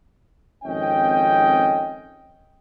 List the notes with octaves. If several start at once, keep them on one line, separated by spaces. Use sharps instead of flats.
G#1 F2 C#4 D#5 G5